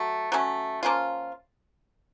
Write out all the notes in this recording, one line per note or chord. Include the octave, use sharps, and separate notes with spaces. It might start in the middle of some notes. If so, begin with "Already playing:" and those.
Already playing: F#3 A3
F#3 A3 C#4
F3 A#3 C#4 F4